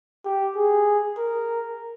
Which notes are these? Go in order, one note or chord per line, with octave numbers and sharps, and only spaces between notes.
G4
G#4
A#4